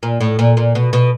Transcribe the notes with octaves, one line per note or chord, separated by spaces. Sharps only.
A#2
A2
A#2
A#2
B2
B2